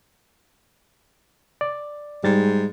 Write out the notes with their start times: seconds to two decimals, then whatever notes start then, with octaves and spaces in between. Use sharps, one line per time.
1.61 D5
2.24 G#2 G3 A6